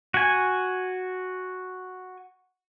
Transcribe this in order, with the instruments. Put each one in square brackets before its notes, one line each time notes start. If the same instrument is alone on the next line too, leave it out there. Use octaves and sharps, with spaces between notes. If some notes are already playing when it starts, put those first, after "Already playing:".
[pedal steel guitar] F#4 G#5